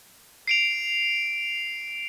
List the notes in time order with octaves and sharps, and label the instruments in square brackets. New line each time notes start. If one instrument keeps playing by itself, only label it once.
[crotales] C7 D7 F7